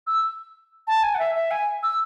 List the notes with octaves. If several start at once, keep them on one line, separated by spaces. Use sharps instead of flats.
E6
A5
G#5
F#5
E5
E5
G#5
E6